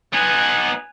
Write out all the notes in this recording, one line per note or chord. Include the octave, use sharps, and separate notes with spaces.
B3 D#4 G#5 F#6